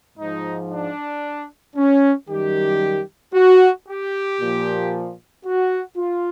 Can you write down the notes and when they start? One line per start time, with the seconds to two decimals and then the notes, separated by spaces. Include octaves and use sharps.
0.18 G#2 F3 D#4
0.71 D4
1.76 C#4
2.28 F#2 D#3 G3 G4
3.34 F#4
3.87 G4
4.40 A#2 F3
5.45 F#4
5.97 F4